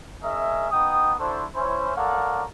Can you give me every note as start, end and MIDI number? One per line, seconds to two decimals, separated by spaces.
0.23 0.71 61
0.23 0.71 68
0.23 0.71 70
0.23 0.71 75
0.23 0.71 76
0.71 1.13 59
0.71 1.13 63
0.71 1.13 79
0.71 1.13 87
1.20 1.44 62
1.20 1.44 64
1.20 1.44 66
1.20 1.44 69
1.20 1.44 72
1.55 1.92 61
1.55 1.92 64
1.55 1.92 72
1.96 2.44 69
1.96 2.44 70
1.96 2.44 73
1.96 2.44 74
1.96 2.44 77
1.96 2.44 78